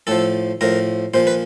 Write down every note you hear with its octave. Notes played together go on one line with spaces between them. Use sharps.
A2 F3 A4
A2 F3 A#4
A#2 F3 C5
B4